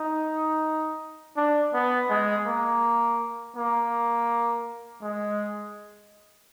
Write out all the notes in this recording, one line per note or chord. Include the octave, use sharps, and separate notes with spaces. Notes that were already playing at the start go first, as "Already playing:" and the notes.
Already playing: D#4
D4
B3
G#3
A#3
A#3
G#3